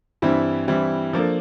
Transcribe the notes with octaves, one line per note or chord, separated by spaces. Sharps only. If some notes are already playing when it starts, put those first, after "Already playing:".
G2 E3 G3 C4 E4
G2 E3 G3 C4 E4
F3 A#3 D4 A4